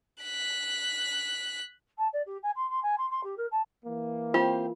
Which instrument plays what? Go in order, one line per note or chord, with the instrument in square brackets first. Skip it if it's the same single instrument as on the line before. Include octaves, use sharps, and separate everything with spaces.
[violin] F#6 B6
[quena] A5
D5
G4
G#5
C6
C6
G#5
C6
C6
G4
A#4
A5
[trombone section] E3 A#3
[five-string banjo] C4 G4 C5 [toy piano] F4